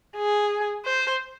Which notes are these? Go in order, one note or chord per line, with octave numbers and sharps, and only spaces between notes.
G#4
C5